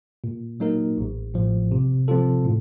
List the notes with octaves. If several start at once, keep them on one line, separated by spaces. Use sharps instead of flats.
A#2
F#3 A#3 D#4 A#4
A1
A2 F3
C3
F3 C4 F4 A4
A2